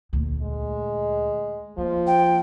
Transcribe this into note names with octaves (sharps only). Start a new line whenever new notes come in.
D2 A#2
G#3
D2 F3 A#3
G5